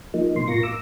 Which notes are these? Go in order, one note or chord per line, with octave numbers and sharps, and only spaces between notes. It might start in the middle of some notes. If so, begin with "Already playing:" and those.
F3 A#3 D#4
B2 C6
A2 F4 A#4 C#6 A#6
D6 E6